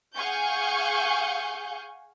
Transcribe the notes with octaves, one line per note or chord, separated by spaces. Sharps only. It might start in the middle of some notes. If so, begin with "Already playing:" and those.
G#4 F5 F#5 G#5 C#6 G6